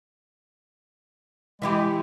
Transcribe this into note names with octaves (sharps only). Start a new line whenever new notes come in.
E3 G#3 E4 G4